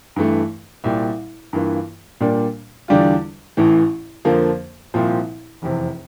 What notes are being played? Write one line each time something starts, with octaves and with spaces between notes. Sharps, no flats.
G2 E3 A3
C2 A#2 G3
G2 E3 A#3 F4
A#2 G3 A#3 D4
E2 D3 G3 D4 F4
A1 A2 E3
F2 D3 F3 A#3
C2 A#2 F3 C4
F1 E2 C3